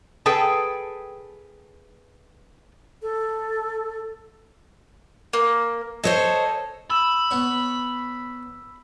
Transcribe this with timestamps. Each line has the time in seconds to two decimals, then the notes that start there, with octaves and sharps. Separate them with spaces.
0.26 G#4 A4 B4 G5
3.03 A4
5.33 A#3
6.04 A4 C5 C#5 D#5
6.90 B5 E6 E7
7.31 B3 C#5